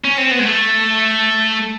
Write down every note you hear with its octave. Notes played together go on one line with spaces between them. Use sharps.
C#4
C4
B3
G#3
A3